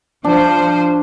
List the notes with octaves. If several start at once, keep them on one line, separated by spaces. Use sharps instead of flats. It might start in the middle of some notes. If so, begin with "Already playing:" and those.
F3 D4 C5